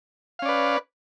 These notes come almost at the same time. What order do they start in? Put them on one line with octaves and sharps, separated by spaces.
F5 C#4 D5 B4